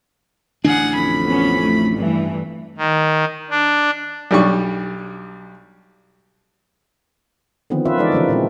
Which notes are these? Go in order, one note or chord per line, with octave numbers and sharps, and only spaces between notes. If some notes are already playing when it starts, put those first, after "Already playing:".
A1 D3 D4 G#4 F#5
F2 B5
B3 C#4
A3
G2 E3 A3
D#3
D4
B1 G3 D4 C#6
D3 D#3 F3 B3 C4
C#4 F4 B4 E5
E3 F3 G#3 D#4 A4 D5
C#3 E3 F3 G3 A#3
A#2 G#3 C4